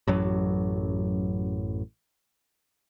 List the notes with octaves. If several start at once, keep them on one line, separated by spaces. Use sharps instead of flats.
A1 F#2 F#3